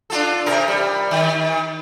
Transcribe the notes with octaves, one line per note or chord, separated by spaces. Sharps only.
D4 F4 A4
C3 A#4
G3
D#3